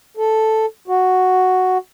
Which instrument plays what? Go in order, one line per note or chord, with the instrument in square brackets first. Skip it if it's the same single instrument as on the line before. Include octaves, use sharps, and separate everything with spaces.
[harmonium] A4
F#4